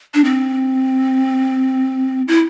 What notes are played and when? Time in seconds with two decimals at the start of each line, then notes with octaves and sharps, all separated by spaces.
0.14 D4
0.24 C4
2.28 E4